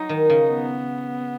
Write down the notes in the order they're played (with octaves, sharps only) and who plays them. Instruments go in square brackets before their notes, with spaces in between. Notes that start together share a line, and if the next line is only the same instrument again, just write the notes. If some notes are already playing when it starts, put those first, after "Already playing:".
Already playing: [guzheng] F#3 [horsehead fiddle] D#4
[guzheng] D#3
C#3
[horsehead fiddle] B3